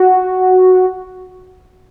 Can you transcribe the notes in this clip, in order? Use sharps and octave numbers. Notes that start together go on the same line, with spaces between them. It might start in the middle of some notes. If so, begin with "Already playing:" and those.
Already playing: F#4